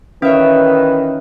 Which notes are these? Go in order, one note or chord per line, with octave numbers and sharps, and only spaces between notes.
D#3 E3 C#4 B4 C#5 E5 F5